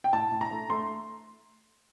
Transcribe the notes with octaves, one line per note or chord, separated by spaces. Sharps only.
G5
A2 A5
A2
A#5
A3
A3 C6